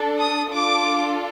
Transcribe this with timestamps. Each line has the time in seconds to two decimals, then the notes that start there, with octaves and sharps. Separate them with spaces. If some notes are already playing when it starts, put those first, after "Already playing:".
Already playing: D4 A4
0.19 D#6
0.52 D4 F4 A4 D6